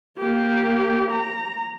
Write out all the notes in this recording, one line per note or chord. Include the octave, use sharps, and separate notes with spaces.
A#3 G4
A#5